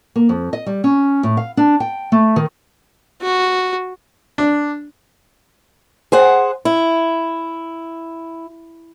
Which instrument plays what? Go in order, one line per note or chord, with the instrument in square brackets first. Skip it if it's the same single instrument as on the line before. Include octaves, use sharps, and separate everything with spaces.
[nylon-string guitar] A#3
F2
D#5
G3
C#4
A2
F5
D4
G5
A3
D#3
[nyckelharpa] F#4
[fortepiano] D4
[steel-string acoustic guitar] G#4 C5 F#5
E4